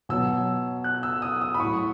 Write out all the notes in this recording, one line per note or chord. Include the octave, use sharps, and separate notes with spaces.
B2 F#3 E6
F#6
E6
D#6
D#6
B5
A2 F#3 C#6